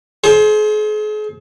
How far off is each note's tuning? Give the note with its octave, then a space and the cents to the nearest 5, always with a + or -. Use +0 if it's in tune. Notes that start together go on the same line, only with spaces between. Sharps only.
G#4 +40 C5 +15